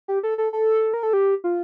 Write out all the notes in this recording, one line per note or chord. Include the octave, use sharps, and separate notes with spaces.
G4
A4
A4
A4
A#4
A4
G4
F4